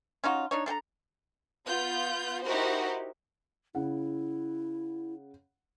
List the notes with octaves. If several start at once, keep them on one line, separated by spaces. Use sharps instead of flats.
C#4 D#4 F4 F#4
D4 D#4 C#5
D4 A4 G5 A#5
B3 F4 G6
D#4 E4 F#4 G4 A#4 C5
C#3 E4 F#5